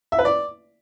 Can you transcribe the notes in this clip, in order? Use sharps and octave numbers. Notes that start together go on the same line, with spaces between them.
E5
B4
D5